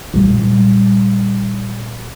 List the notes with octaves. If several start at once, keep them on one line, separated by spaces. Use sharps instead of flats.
A#2 G3